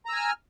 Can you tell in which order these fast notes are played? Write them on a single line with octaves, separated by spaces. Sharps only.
A#5 E6 G#5 F6